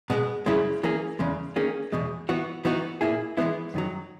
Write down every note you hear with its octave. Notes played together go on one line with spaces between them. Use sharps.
B2 G#3 B3
F#2 C#3 G#3 C#4 E4
E3 A#3 C#4 G#4
E2 C#3 G#3
D#3 A#3 C#4 G#4
E2 B2 G#3
E3 B3 F#4
E3 B3 D#4 F#4
A#2 A#3 E4 G#4
E3 G#3 B3 E4
F#2 D#3 F#3